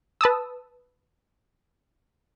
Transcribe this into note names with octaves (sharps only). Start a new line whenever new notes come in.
B4 A5 D#6 E6